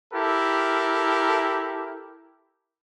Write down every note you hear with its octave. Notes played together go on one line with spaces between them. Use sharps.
E4 G4 A4 A#4